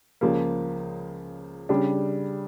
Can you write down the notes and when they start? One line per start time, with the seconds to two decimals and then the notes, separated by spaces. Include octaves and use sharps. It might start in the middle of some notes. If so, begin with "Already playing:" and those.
0.21 C#2 C#3 F3 A#3
1.69 C#3 G3 D4